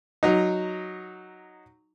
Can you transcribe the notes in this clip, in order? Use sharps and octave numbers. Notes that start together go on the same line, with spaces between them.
F#3 D#4